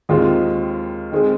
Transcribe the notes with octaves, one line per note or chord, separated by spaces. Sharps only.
D#2 D#3 G#3 C4 F4
D#3 G#3 C4 G#4